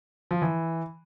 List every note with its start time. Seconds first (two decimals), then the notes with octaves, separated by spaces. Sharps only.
0.31 F3
0.42 E3